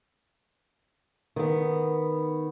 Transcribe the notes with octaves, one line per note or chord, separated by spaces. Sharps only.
D#3 B3